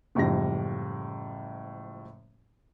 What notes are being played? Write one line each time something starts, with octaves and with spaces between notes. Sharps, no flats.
F#1 A2 F3 G3 A#6